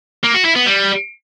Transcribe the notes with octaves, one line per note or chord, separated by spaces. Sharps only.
A#3
F#4
E4
B3
G3